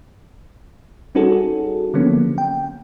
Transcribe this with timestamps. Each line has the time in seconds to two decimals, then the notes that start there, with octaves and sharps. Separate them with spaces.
1.15 G3 C#4 D#4 F#4 G#4 A4
1.94 D3 F3 F#3 A#3 B3 C#4
2.38 G5